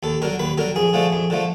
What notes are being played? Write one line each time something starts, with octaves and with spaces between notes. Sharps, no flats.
D#2 A4
D3 F#3 A#4
D#2 B4
D3 F#3 A#4
F2 G#4
D3 F3 A3
F2
D3 F3 A3